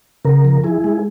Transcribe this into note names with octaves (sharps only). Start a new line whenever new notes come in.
C#3 A#4
F3
E4 G#4
G#3